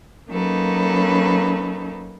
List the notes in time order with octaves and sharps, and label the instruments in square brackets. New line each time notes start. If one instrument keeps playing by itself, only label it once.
[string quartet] F#3 A#3 C#4 D#4 A4 B4